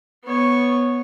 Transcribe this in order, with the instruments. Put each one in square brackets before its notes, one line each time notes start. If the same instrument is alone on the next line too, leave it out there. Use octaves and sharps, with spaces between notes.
[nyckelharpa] B3 C#5